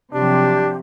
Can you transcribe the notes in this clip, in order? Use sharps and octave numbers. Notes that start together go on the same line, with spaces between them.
C3 F3 F#3 D4 G4